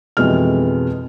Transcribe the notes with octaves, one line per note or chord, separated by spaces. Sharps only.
F2 B2 E3 G#3 F6